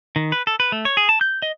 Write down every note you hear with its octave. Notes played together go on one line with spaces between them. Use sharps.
D#3
B4
A4
B4
A3
C#5
G#4
A5
G6
D#5